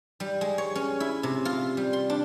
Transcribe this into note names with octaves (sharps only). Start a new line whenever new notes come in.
G3
G#3
C#5
C#4
E4
C3
F4
G3
C6
D4